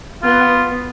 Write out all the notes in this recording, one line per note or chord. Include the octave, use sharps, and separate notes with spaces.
B3 F4